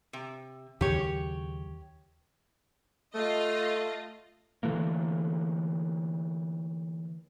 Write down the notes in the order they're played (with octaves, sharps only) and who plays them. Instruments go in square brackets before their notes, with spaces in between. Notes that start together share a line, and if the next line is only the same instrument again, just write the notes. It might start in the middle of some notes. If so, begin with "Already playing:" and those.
[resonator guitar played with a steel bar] C3
[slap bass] D#2 C#3 F#3 [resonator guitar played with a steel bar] G4 C#5
[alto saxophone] A3 [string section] F4 D#5
[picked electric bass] D3 E3 A3 A#3